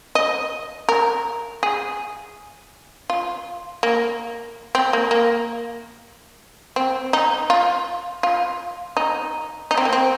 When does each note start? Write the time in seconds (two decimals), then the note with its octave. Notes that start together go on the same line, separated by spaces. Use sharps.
0.15 D#5
0.89 A#4
1.63 G#4
3.10 F4
3.83 A#3
4.75 C4
4.93 A#3
5.11 A#3
6.76 C4
7.13 D#4
7.50 F4
8.23 F4
8.97 D#4
9.71 D#4
9.78 C4
9.85 A#3
9.93 C4